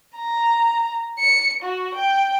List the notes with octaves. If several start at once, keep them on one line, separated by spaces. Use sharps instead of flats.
A#5
C#7
F#4
G5